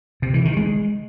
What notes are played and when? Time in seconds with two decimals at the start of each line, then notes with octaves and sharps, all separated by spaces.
0.22 C3
0.34 E3
0.45 D#3
0.57 G#3